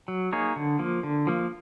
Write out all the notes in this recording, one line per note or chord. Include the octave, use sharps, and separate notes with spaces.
F#3
A#3 D#4 G#4 C#5
D3
F3 A#3
D3
F3 A#3